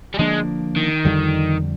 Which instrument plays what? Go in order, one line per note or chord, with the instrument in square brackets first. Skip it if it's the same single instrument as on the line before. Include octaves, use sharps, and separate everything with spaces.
[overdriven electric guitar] G3
[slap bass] D3 F3 A#3 D4 [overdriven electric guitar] G#3
[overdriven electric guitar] D#3
[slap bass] F2 D3 G3